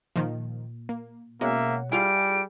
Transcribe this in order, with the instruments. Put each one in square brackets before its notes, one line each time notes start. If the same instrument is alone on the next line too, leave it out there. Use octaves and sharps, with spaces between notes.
[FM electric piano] A#2 [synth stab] D#3 F3
[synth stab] A#3
[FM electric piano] B2 C#4 F#5 [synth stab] G#3 [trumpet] A#3 [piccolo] E5
[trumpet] G3 [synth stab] E4 F4 F5 [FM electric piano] G#4 G#5 D6 [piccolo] D7